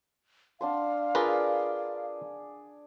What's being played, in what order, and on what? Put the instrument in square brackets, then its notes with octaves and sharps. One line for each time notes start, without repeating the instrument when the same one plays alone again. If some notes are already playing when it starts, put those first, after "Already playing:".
[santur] D4 F#5 C6 [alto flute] F5
[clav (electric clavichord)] F4 A#4 B4 [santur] G#4 D5